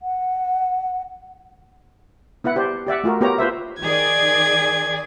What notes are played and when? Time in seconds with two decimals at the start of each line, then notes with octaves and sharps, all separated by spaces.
0.01 F#5
2.44 B3 E4 B4 F#5
2.56 G4 C5 D5
2.87 G4 D5 E5 F#5
3.04 A3 F4 F#4 A#4
3.21 B3 F4 G4 A#4 C#5 A#5
3.38 F4 B4 C5 E5
3.81 D#3 G#4 D5 G#6